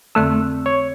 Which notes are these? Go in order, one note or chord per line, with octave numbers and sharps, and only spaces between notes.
F2 D3 A3 C4 E6
C#5